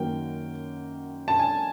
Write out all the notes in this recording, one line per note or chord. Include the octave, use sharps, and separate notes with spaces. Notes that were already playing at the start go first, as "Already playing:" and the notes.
Already playing: F#2 D#3 F#3 A#3 G5
A5
G#5